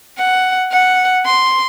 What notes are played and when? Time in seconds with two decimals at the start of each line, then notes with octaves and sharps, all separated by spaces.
0.18 F#5
0.72 F#5
1.25 C6